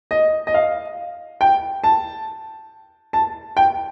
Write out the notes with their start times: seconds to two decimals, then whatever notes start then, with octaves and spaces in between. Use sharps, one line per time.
0.11 D#5
0.47 D#5
0.54 F5
1.41 G5
1.84 A5
3.13 A5
3.57 G5